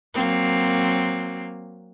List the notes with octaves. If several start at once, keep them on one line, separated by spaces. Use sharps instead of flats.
F#3 A#3 C4